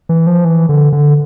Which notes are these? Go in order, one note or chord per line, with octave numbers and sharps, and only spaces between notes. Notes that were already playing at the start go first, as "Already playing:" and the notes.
E3
F3
E3
D3
D3